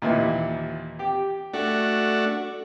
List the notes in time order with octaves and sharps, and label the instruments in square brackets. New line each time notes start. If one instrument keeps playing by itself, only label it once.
[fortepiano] D#2 A#2 E3
G4
[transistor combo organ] A3 D4 F#4